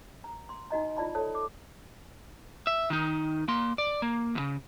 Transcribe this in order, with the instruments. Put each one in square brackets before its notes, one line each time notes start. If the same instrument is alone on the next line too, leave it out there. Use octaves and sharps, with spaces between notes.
[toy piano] A#5
C6
D#4 F#4 D#5 A#5
F4 D5 A5 B5
A4 C#5 A5
D6
[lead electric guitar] E5
D#3 D#4
A#3 C6
D5
A#3
E2 C#3